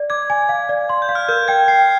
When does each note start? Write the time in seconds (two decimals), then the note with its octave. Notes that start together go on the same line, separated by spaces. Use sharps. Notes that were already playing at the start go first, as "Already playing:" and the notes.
Already playing: D5
0.10 D6 G#6
0.30 G#5
0.49 F5
0.69 D5
0.89 C6
1.02 G6
1.09 F5
1.15 F6
1.29 A#4 G6
1.48 G5 G#6
1.68 G5 C7